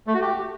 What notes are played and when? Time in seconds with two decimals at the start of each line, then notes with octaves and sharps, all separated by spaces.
0.07 A3
0.14 F#4
0.21 G4